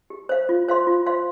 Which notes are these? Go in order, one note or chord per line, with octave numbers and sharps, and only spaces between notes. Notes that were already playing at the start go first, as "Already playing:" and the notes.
G4
C5 F5
F4
C5 F5 C6
F4
C5 F5 C6